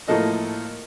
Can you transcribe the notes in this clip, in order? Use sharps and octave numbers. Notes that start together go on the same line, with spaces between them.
A2 F3 A#3 A4 D#5